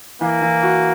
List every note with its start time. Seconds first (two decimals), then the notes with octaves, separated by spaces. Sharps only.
0.21 E3 A#3
0.42 E3
0.63 F#4